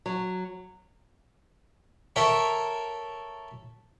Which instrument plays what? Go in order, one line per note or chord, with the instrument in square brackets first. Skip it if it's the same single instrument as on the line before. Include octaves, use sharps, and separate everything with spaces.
[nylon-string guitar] F#3
[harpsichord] A4 A#4 C#5 E5 G5